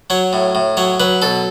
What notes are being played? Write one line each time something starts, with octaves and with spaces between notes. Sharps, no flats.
F#3 C#5
A2
A2
F#3 C#5
F#3 B4
B2 A4